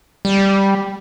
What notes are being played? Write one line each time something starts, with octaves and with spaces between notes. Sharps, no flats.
G3